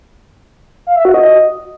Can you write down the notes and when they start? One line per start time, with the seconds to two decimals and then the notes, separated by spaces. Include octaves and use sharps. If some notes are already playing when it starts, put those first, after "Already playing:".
0.87 F5
0.96 E5
1.05 F#4
1.14 D#5